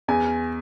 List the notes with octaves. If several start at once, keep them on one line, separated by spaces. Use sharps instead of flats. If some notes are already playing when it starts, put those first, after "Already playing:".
E2 G#5